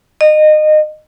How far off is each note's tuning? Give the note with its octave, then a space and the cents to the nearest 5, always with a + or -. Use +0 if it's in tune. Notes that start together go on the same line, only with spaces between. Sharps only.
D#5 -25